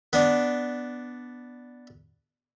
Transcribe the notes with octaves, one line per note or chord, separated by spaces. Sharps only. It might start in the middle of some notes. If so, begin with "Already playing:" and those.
B3 D4